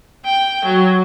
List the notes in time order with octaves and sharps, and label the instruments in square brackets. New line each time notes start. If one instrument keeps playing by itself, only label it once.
[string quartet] G5
F#3